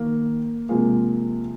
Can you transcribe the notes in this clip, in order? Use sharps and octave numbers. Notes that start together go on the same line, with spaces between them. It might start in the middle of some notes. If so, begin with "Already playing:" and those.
Already playing: D#3 A#3
C3 F3 G#3 A#3